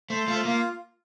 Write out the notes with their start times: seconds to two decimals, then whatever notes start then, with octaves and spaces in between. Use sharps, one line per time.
0.10 A3 C5
0.28 A3 F4
0.45 A#3 F4